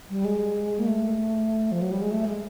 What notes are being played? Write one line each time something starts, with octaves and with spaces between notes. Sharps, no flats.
G3
G#3
A#3
A3
F3
F#3
G3
G#3
A3
G#3